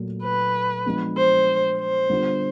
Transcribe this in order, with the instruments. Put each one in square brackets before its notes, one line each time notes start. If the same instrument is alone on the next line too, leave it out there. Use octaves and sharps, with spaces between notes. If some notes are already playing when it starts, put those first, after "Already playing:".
Already playing: [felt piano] A#2 F#3 A3
[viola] B4
[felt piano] F3 G#3 B3 D4
[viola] C5
C5
[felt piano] D3 G3 B3 D4 F4